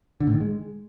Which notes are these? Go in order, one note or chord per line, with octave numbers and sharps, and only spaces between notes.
D3
A2
D#3
G#3